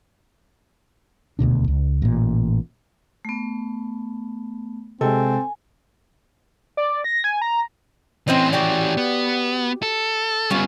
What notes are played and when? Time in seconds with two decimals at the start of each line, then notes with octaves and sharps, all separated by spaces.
1.39 D#1 D2 B2 D4
1.68 C#2
2.02 A1 A#2
3.25 A3 B3
5.01 C3 G#3 C4 A4 G#5
6.77 D5
7.04 A#6
7.24 G#5
7.42 A#5
8.28 E3 C4 C#4 C5 D#5
8.53 F#4 G4 D5
8.97 B3
9.83 A4
10.51 G3 B3 C#4 F4